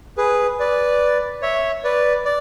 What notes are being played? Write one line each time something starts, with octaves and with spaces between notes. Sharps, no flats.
G#4 B4
B4 D5
C#5 E5
B4 D5
D5